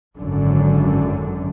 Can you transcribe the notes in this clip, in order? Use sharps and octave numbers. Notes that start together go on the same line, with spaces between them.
G#1 F#2 D3